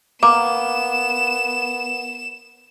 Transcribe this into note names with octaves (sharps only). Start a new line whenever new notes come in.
A#3 B3 D6 E7